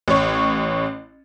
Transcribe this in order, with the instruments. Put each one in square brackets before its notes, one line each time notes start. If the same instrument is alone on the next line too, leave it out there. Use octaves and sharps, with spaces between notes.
[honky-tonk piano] A1 C#5